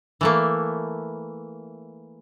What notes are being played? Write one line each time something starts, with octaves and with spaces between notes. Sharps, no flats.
E3 A3 A#3